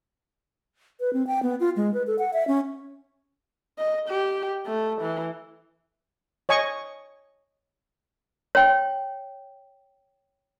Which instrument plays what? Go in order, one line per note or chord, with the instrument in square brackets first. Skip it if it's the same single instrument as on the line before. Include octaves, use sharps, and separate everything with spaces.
[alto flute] B4
C4
G5
B3
F4
G#3
B4
A4
F#5
E5
C#4
[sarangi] D#5
G4
A3
E3
[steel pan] C#5 D#5 G#5 C#6
[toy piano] C#5 G5